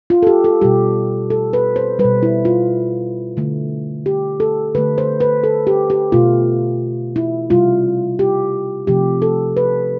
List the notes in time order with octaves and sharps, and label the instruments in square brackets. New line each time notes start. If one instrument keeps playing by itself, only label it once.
[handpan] F4
A4
G4
A4
B2 G3 G4
A4
B4
C5
G3 B4
B2
E4
F4
D3 A3
G4
A4
D3 A3 B4
C5
B4
A4
G4
G4
B2 A3 F4
E4
C3 G3 F4
G4
C3 F3 A3 G4
A4
B4